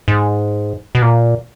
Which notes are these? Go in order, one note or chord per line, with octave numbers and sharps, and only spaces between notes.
G#2
B2
A#2